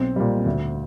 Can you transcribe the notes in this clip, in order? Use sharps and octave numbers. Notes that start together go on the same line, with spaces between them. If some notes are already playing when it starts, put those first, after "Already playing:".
Already playing: B1 C4
A#2 G3
D2